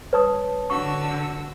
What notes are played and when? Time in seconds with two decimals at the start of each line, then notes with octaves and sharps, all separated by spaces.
0.13 B4 C#5 A5 D#6
0.70 D3 F#4 C#6 E6